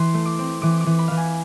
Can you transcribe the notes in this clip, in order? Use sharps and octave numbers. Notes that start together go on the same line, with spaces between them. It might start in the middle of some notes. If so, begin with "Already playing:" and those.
Already playing: E3 C6
A3
D6
C4
E3 D6
D6
E3
B5
E3 F5
G#5